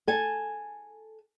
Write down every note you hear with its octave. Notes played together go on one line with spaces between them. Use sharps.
A4 G#5 A5